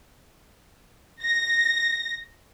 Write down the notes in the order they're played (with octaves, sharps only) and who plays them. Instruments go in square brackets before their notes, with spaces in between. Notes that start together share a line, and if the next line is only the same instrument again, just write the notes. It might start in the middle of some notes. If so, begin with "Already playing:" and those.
[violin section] A#6